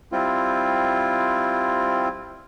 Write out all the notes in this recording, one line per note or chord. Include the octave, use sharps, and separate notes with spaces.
G3 C4 E4 F4